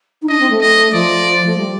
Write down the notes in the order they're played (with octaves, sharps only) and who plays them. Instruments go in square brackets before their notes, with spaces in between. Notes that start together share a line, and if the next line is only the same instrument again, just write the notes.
[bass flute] D#4
[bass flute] D4 [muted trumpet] D#5
[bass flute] C4
A3
[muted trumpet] D#5
[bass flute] F3 [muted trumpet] D5
[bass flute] A3
G3